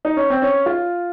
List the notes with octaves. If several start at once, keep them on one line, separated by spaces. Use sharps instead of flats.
D#4
C#4
C4
C#4
F4